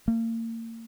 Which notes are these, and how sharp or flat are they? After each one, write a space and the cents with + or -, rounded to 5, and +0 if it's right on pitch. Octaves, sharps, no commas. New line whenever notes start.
A#3 -35